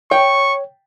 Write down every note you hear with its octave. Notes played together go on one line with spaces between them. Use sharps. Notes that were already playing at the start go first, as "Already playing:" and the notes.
C#5 G5 C#6